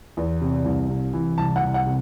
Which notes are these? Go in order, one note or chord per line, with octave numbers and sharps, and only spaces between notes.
E2
C3
C2
C3
E3
C2 A5
F#5
C2
F#5
C3